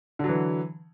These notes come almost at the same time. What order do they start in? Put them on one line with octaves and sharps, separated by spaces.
D3 F#3 E3